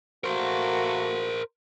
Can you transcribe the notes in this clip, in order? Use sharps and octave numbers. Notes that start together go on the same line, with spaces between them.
A3 A#3 F#4 A#4 C5